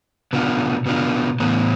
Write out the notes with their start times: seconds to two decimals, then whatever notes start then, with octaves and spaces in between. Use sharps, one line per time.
0.33 B2 B3 D4 F4
0.86 B2 B3 D4 F4
1.40 A2 E3 B3